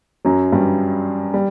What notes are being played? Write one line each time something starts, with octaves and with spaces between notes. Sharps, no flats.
F#2 F#3
G2 G3
G3